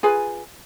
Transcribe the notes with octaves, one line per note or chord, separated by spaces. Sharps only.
F4 G#4 B4 G#5